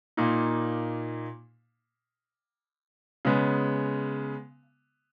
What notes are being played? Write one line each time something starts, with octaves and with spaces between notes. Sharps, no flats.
A#2 A#3 D#4
C#3 G#3 B3